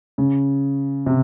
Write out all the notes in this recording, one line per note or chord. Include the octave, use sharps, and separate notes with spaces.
C#3
C3